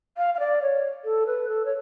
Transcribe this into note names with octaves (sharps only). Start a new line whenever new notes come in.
F5
F5
D5
C#5
A4
B4
A4
C#5